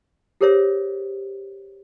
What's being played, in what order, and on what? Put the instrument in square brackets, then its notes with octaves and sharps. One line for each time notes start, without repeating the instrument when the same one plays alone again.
[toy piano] G4 G#4 A#4 C5 C#5 E5